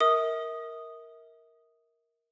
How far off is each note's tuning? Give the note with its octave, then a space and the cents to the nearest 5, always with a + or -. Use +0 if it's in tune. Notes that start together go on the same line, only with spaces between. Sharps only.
A#4 +0 E5 -40 D#6 -5